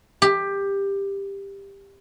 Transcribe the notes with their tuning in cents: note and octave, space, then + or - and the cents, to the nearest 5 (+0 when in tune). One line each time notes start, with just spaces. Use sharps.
G4 +15